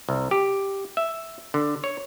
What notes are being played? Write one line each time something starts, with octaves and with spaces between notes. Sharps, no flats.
C2
G4
E5
D3
C#5